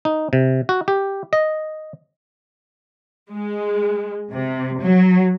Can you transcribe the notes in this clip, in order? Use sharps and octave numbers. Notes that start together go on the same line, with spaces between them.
D#4
C3
F#4
G4
D#5
G#3
C3
F#3